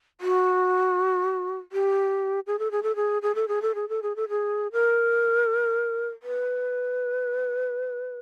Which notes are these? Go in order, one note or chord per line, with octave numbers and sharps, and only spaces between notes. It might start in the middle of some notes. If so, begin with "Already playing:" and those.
F#4
G4
G#4
A4
G#4
A4
G#4
G#4
A4
G#4
A4
G#4
A4
G#4
A4
G#4
A#4
B4